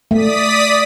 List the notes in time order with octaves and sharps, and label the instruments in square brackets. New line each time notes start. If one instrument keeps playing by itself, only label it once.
[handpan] A3 [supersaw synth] D5 D#6 B6